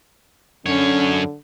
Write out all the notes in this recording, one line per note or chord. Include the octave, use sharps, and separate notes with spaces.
F#2 D3 C#4 C#5